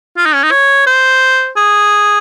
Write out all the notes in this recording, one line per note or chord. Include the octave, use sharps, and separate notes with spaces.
F4
D#4
C#4
D#4
C#5
C5
G#4